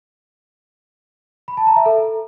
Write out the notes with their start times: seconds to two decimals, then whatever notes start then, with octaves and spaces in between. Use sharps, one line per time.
1.48 B5
1.57 A5
1.67 A#5
1.76 E5
1.86 A4